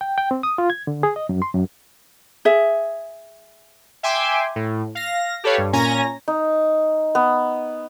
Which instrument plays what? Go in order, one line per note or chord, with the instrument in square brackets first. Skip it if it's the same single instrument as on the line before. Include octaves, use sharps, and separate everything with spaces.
[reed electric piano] G5
G5
C4
D#6
F4
G#6
D3
G#4
D#5
F#2
C6
F#2
[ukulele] G#4 E5
[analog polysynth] E5 G5 G#5 C6 D6
A2
F5 A#6
G4 A4 B4 C#5 F5
G2
A#2 C#4 G#5 A#5 A#6
[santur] D#4
B3